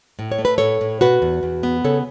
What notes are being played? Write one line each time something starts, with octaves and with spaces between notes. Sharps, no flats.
A2
C#5
A3
B4
A2 A4 C#5
A2
B2 F#4 B4
E2
E2
B3
C#3 A4 C#5